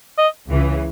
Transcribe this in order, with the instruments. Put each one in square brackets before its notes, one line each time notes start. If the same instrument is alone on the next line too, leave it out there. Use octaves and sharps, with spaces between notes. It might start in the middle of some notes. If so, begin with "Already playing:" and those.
[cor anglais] D#5
[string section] C#2 C#3 E3